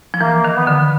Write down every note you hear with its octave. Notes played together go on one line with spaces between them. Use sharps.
F3
E3 A#3
D#3
B3
D3